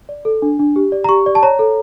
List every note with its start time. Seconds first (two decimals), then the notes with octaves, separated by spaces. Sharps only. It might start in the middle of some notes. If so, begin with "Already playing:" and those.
0.09 D5
0.25 A4
0.42 D4
0.59 D4
0.76 G4
0.92 D5
1.04 A#5
1.09 G4 C#6
1.26 D5
1.35 A5
1.43 C#5 A#5
1.59 A4